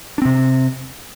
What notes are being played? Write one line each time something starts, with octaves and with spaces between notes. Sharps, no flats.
C3 C4 D4